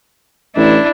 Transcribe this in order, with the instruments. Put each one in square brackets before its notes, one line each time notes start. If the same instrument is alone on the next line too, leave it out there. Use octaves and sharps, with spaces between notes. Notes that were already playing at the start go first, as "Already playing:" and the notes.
[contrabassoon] A1 [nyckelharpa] D4 E4